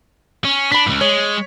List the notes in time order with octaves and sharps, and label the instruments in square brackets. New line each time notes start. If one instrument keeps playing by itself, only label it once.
[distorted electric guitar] C#4
[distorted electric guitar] D4 [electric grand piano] B5 B6
[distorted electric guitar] C#2 G2
[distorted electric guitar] G#3 [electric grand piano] C#5